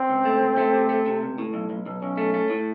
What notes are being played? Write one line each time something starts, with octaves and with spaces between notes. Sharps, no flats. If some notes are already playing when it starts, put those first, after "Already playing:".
Already playing: C4
C#2
A3
C#2
A3
C3
A3
C3
C#2
A2
B1
B1
B1
B1 C#4
A3
A3
A2